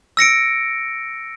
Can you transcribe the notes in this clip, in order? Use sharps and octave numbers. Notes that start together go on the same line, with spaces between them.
E6 A#6 C#7 D7